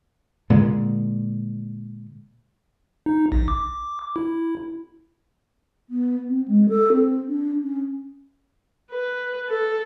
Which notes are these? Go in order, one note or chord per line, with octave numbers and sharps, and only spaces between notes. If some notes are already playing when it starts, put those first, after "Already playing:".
A#2 D3 G#3
D#4
A#1
D6
E4
B3
C4
G#3
A4
C4
D4
C#4
B4
A4